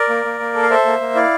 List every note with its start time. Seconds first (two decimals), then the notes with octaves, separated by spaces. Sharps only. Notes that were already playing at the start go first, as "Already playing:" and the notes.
Already playing: A#4 D5
0.09 A#3
0.25 A#3
0.40 A#3
0.55 A4
0.63 F5
0.70 A4 C5 E5
0.85 A#3
1.00 A#3
1.15 E4 D5 F5